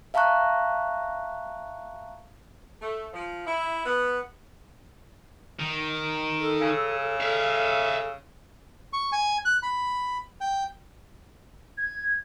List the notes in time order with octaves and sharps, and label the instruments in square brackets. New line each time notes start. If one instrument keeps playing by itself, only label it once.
[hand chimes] E5 F5 A5 A#5 C#6 F#6
[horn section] A3
F3
E4
B3
[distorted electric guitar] D#3
[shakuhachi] A4
[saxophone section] C#3
[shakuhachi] A4 [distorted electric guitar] E5 F5
[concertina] C#6
G#5
F#6
B5
G5
[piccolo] G#6